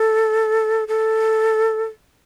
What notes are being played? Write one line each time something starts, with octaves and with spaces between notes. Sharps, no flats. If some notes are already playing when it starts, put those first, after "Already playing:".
Already playing: A4
A4